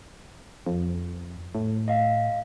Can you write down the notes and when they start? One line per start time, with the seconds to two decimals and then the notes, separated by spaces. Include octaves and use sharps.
0.66 F2
1.55 A2
1.88 D#5 F5